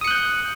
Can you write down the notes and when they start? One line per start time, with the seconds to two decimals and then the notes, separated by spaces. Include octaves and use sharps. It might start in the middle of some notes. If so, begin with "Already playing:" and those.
0.01 D#6
0.04 C#7
0.08 F#6
0.11 G6